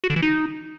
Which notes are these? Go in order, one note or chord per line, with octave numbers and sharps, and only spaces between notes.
F#4
D3
E3
D#4